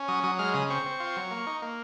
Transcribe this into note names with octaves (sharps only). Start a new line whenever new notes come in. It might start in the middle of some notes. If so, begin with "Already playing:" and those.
Already playing: C#4
F#3 D#6
F#3 D#6
G#3 F6
C#3 D#6
C4 C#6
C4
F4
F#3
A#3
D#4
A#3